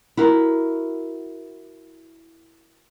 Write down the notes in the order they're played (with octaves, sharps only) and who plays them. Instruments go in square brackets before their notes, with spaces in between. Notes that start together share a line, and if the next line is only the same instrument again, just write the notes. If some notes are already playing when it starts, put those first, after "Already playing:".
[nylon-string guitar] E4 F#4 A#4